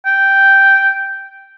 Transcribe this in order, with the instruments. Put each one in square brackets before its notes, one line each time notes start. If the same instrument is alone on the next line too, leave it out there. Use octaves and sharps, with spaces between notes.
[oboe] G5